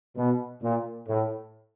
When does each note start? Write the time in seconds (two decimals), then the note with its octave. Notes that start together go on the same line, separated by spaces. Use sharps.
0.17 B2
0.62 A#2
1.08 A2